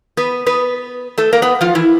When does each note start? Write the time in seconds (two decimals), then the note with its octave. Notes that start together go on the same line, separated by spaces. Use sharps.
0.17 B3 B4
0.46 B3 B4
1.18 A3 A4
1.33 A#3 A#4
1.42 B3 B4
1.61 F3 F4
1.75 E3 E4